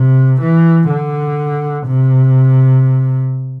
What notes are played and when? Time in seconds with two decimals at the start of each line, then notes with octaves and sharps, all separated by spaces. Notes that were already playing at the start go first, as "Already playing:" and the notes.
Already playing: C3
0.41 E3
0.90 D3
1.87 C3